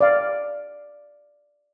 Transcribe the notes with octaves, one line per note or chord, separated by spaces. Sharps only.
D5 F5